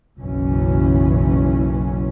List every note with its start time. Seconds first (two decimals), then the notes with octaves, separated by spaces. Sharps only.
0.17 F#1 B1 F#2 E3 C#4